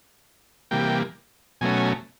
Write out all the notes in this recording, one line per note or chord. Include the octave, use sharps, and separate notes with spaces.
C3 E3 G3 A#3 G5
B2 F#3 A3 C#4 G#5